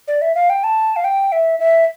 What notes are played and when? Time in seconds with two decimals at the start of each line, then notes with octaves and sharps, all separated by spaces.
0.08 D5
0.22 E5
0.35 F5
0.50 G5
0.64 A5
0.96 F5
1.04 G5
1.32 E5
1.59 E5